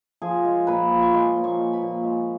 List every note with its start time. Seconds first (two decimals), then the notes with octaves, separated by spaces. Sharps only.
0.22 F3 G#4 G#5
0.45 G#3
0.67 A#2 B4 B5
0.90 F3
1.02 C#6
1.13 G#3 C5 C6
1.36 A#2
1.44 C#5 C#6
1.59 G#3
1.73 B4 B5
1.82 A#2
2.03 G#3